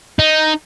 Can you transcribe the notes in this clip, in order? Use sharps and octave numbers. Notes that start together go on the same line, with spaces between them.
D#4